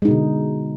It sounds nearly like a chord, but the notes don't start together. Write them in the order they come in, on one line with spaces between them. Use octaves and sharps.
G#3 D#4 B2 D3